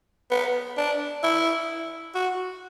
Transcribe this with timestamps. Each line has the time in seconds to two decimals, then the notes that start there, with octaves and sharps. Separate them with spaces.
0.31 B3
0.77 D4
1.24 E4
2.15 F#4